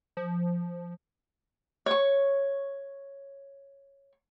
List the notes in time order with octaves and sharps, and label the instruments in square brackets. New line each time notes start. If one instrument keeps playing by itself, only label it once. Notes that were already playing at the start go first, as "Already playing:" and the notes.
[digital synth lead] F3
[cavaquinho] C#5 C#6